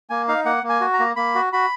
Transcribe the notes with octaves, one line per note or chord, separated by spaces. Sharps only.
A#3 G#5
D#4 F5
A#3 F#5
A#3
G#5
F#4
A#5
A#3
A#3 B5
F#4
F#4 B5